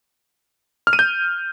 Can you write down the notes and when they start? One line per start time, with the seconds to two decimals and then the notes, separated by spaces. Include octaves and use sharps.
0.87 F6
0.93 D#7
0.99 G6